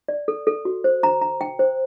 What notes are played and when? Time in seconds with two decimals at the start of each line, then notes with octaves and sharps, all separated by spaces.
0.08 D5
0.28 A4
0.47 A4
0.65 F#4
0.84 C5
1.03 A#5
1.21 A#5
1.41 G5
1.59 C5